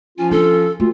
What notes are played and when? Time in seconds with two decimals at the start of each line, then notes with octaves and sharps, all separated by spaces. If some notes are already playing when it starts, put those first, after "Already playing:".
0.19 F3 C#4 F4 G#5
0.31 D4 A4
0.80 D2 A3 F4